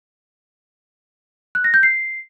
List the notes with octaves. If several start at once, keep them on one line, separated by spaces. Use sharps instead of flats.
F#6
A#6
G6
C7